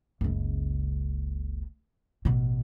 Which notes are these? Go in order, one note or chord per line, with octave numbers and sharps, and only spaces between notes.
F#1 C#2
A1 B2